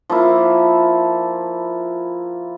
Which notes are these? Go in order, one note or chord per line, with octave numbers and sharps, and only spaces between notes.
F3 A#3 E4